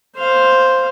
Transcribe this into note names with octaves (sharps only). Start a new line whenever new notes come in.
C5 F5